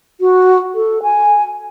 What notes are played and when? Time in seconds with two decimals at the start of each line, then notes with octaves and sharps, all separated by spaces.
0.21 F#4
0.75 A4
1.03 G#5